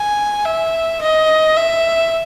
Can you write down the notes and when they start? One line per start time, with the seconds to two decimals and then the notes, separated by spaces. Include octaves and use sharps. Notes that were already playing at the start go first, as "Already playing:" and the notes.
Already playing: G#5
0.45 E5
1.02 D#5
1.56 E5